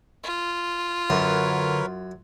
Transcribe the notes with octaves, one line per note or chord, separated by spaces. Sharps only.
F4
F#2 D3 A#4 B4 C#5